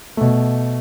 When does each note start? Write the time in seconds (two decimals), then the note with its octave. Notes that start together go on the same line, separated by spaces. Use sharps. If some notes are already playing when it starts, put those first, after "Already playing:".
0.17 B2 A3